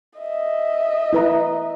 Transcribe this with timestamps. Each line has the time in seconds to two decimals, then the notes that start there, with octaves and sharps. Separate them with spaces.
0.20 D#5 E5
1.13 E4 B4 A#5